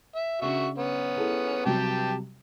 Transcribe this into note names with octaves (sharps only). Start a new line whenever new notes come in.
E5
C#3 D4 F#4 E5 C#6
B3 C#4
E4 G#4 A4
C3 F#3 G3 G4 G5 A5